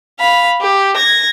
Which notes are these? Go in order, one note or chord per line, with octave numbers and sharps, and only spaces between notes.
F5 B5
G4
G#6 A#6